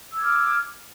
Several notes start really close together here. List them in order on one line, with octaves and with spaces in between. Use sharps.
E6 G#6 D6 F6